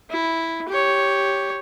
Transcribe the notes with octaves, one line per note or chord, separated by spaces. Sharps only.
E4
G4 C#5